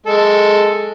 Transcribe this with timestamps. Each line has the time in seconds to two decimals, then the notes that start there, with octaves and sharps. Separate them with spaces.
0.06 G#3 A4